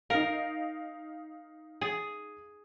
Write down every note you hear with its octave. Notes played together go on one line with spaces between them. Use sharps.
D#4 A#4 F5
G#4